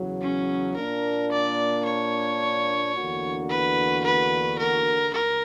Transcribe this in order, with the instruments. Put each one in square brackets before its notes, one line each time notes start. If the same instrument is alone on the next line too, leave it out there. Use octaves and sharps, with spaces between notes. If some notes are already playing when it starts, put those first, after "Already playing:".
Already playing: [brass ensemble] E2 C#3 F#3
[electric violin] C#4
[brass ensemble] A#2 A#3 D4 [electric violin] A#4
[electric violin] D5
C#5
[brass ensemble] E2 D3 A#3 D4 F#4
[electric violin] B4
B4
A#4
[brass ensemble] C#2 [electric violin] A#4